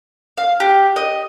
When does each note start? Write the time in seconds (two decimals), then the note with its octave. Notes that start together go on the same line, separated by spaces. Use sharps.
0.37 F5
0.60 G4
0.96 D#5